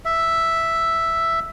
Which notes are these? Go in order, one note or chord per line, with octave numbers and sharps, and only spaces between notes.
E5